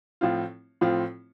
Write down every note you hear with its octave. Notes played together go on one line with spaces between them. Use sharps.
A2 F3 C4 F4
A2 F3 C4 F4